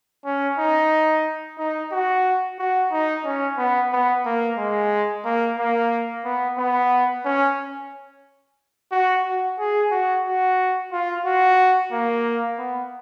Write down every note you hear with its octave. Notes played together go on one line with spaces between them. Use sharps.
C#4
D#4
D#4
F#4
F#4
D#4
C#4
B3
B3
A#3
G#3
A#3
A#3
B3
B3
C#4
F#4
F#4
G#4
F#4
F#4
F4
F#4
A#3
B3